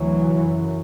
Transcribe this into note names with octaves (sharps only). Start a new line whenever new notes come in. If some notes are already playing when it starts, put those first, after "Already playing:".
Already playing: D2 C3 E3 F#3
F#2 C#3